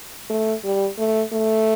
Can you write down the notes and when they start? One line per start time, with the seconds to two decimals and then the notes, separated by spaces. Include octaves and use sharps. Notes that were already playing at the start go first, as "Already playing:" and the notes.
0.30 A3
0.64 G3
0.98 A3
1.33 A3